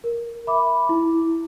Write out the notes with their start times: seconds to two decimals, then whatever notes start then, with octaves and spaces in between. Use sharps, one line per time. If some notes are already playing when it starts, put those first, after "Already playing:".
0.04 A#4
0.47 E5 B5 D6
0.89 E4